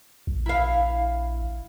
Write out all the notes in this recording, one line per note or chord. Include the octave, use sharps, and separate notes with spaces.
A#1
E4 F5